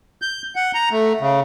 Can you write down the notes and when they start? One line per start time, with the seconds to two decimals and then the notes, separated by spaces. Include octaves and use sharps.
0.22 G6
0.56 F#5
0.74 A#5
0.91 A3
1.20 C#3